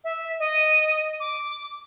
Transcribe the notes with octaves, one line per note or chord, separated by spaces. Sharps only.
E5
D#5
D6